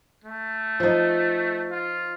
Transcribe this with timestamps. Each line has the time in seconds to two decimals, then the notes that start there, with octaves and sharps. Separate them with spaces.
0.24 A3
0.80 F3 D#4
1.71 F4